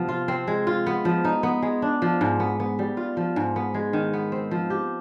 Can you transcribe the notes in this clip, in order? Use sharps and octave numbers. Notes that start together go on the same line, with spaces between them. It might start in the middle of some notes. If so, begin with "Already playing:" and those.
Already playing: C3 F3 B3 C4
F4
C4
G#3
F4
B3
F3
D#4
B3
G#3
D4
F3
G#2
B3
B3
G3
F4
F3
G#2
B3
G#3
D#3
B3
C4
F3
G4